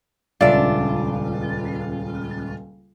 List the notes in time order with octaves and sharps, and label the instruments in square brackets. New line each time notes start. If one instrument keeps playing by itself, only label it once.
[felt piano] D#1 C#2 [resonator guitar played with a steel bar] D4 F4 [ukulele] D5 E5